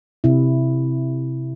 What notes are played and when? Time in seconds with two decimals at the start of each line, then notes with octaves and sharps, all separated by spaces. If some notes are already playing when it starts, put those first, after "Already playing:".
0.24 C3 E4